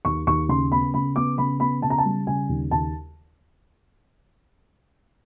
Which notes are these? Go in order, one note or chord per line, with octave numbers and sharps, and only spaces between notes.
D#2 C#6
D#2 C#6
C#3 C6
B3 B5
C#3 B5
B3 D6
C#3 B5
B3 B5
C#3 A5
A#5
A5
G3
C#3 G#5
D#2
D#2 A5